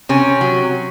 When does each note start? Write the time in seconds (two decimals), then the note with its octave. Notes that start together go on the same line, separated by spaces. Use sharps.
0.09 C3 C#4
0.41 F#3